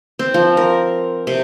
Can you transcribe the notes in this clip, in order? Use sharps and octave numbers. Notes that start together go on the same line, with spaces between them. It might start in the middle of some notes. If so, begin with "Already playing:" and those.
C4
F3
A#4
C3